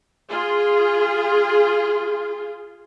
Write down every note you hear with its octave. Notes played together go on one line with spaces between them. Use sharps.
F4 G#4